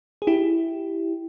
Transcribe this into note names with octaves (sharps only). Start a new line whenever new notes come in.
G#4
E4 G4